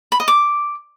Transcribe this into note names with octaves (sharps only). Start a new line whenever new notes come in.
B5
D#5
D6